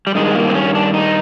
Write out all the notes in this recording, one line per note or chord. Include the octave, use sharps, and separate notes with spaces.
G3
G2 D#3 G#3
A#3
C4
C#4
D4
D#4